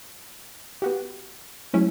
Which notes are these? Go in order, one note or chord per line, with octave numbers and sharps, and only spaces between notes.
B3 F#4 G4
F#3 G#3 A3 C#4 E4